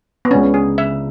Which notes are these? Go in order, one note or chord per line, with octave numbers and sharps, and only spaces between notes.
B3
C#2 C#3 G#3 C#4 D4
G#4
E5